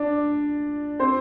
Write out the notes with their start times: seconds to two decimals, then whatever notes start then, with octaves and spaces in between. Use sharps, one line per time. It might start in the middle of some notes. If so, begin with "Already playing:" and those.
Already playing: D4 D5
0.99 C4 C5